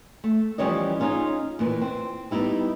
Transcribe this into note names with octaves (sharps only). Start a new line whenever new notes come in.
A3
E3 F3 G3 C#4 C#5 D#5
C#4 D#4 F4 G#4
D#2 A#2 E3
C4
G3 B3 D#4 E4 G4